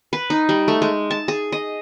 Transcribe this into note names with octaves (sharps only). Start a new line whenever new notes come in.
B4
D#4
G3
A3
G#3
A5
G#4
D#5